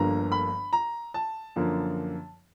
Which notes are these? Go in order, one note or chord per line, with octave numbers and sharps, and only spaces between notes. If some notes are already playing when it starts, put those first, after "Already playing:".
Already playing: G1 G2 D3 F3 A#3 A#5
B5
A#5
A5
F#2 D3 F3 A#3